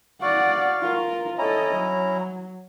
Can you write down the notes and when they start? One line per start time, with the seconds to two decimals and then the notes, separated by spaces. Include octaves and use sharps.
0.22 F#4 D5 F5 F#5
0.82 F4 A#4
1.38 C#4 E4 A4 D#5 A#5
1.76 F#3